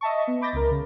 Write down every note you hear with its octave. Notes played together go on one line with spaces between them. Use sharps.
D#5 E5 A5 C#6
B3
B5 D6 G6 A6 A#6
C#2 A#4
C#3